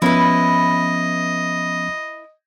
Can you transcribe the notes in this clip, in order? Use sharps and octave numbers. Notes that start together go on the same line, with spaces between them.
F3 B3 C#4 E4 B4 D#5